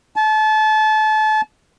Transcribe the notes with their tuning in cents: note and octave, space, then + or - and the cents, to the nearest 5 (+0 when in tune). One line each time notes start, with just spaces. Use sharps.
A5 -30